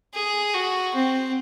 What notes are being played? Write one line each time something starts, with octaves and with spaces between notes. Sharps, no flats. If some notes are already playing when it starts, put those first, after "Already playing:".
G#4
F#4
C4